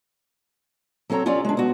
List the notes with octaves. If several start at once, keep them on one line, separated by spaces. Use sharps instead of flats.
F#3 C4 A4 C#5 A#5
C#4 F4 G4 C#5 D5
G#3 D4
B3 F#4